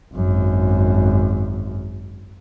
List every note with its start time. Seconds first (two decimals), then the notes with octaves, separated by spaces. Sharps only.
0.13 G#1 F#2